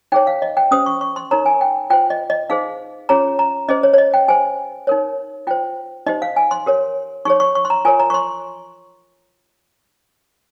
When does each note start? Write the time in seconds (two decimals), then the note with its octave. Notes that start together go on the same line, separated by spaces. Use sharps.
0.12 D#4 G#4 C#5 G5
0.27 F5
0.42 D#5
0.57 G5
0.71 C#4 G4 C5 D#6
0.86 C#6
1.01 C#6
1.16 C6
1.31 D#4 A#4 C#5 A#5
1.46 G#5
1.61 G5
1.90 F4 C5 G5
2.10 D#5
2.30 D#5
2.50 D#4 G#4 C5 F5
3.09 C#4 F4 G#4 C#5 A#5
3.39 A#5
3.68 C#4 G#4 C5 D#5
3.83 C#5
3.94 C#5
3.98 D#5
4.14 G5
4.28 G4 C5 G#5
4.87 D#4 A#4 C#5
5.47 F4 C5 G5
6.06 D#4 G4 C5 D#5
6.22 F5
6.36 G#5
6.51 C6
6.66 G4 A#4 C#5
7.25 D#4 G#4 C#5 C#6
7.40 C#6
7.55 C#6
7.65 C6
7.70 A#5
7.85 F4 A#4 C#5 G#5
8.00 A#5
8.10 C#6
8.14 C6